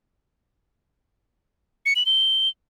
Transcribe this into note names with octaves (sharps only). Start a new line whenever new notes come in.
C#7
F#7
G7